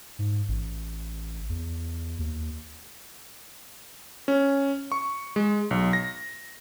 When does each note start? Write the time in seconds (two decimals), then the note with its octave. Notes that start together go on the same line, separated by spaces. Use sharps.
0.19 G#2
0.48 A1
1.49 E2
2.19 D#2
4.28 C#4
4.92 C#6
5.36 G#3
5.71 B1
5.93 A#6